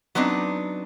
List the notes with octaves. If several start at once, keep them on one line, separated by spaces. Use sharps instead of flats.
F#3 B3 C4 D4 D#4